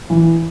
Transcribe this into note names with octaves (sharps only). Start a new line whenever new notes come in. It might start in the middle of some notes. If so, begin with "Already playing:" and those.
E3